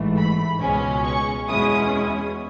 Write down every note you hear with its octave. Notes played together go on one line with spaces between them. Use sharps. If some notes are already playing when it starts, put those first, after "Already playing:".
Already playing: A1 G#2 E3 A3
B5
C#2 B2 G#3 C#4
C#6
E2 B2 G#3 C#4 E4 D#6